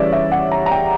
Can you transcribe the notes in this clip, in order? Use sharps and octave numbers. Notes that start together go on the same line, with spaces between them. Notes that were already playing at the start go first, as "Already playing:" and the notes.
Already playing: C#3 E3 G3 C#5 D5 E5
E5
F#5
A#5
A#5
G5